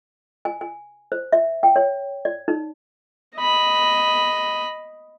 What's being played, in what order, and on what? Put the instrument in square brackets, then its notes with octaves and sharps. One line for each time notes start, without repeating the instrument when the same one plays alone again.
[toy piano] G#5
G#5
C5
E5
G5
C#5
D5
D#4
[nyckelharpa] D#5 B5